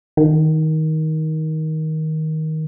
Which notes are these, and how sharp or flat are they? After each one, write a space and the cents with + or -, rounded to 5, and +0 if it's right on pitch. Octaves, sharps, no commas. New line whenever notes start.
D#3 +15